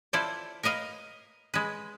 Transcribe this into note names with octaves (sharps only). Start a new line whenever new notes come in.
E4 F4 A4 C5 D5
A#4 B4 D#5 F5
G#3 B4